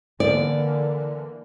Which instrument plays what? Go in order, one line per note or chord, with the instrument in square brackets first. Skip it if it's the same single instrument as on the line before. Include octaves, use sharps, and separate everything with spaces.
[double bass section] D3 E3 A#3 [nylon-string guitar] D5